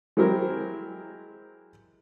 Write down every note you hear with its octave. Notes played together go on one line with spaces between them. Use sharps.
F#3 G#3 C4 E4 G4 A#4